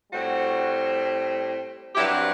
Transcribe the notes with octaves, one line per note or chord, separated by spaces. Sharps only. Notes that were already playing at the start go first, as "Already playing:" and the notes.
A2 G3 C4 F#4
G2 F#3 C4 E4 G4